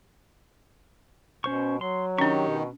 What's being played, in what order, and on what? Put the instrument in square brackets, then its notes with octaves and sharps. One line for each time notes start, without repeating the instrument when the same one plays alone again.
[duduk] B2 [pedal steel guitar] C#4 C5 C#6
[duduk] F#3 [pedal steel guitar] C6
[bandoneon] D#3 [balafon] C#4 D4 [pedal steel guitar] G4 C#6
[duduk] B2